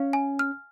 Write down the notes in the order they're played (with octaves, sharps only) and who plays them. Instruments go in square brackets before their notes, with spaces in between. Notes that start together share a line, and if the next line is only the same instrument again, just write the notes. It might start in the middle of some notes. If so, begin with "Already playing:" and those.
Already playing: [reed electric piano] C#4 [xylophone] F5
[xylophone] G#5
F6